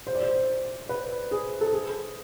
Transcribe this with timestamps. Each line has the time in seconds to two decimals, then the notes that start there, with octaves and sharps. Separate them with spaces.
0.07 C5
0.15 D5
0.23 C5
0.89 B4
1.31 G#4
1.61 A4
1.73 G#4